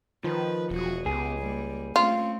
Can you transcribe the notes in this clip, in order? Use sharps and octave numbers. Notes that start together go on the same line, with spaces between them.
D#3 F3 B4
E1 F#3 F#4 G#4
C#2 B3 G4 G#4
G3 A#3
A3 C4 C#4 F4